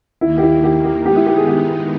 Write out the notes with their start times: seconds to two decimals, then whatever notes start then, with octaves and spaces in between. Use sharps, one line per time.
0.21 D#2 D#3 A#3 E4
0.37 G4
0.43 E4
0.63 G4
0.85 G4
1.05 D#3 G#3 B3 D#4 G4
1.16 E4
1.26 G4
1.36 G#4
1.47 G4